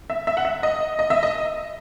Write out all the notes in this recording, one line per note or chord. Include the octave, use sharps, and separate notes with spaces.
E5
E5
F#5
E5
D#5
D#5
E5
D#5